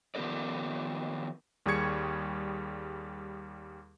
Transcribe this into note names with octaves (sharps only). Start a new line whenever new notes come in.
D#3 F3 B3 G4 A#4 D5
D#2 G3 G#4 C#6 G#6 C#7